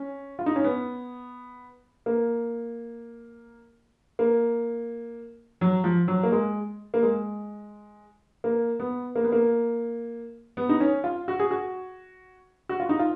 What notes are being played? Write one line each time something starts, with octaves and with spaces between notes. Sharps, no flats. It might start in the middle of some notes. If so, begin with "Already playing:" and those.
Already playing: C#4
F4
D#4
C#4
B3
A#3
A#3
F#3
F3
F#3
A#3
G#3
A#3
G#3
A#3
B3
A#3
B3
A#3
B3
D#4
C#4
F4
F#4
G#4
F#4
F#4
F4
D#4
F4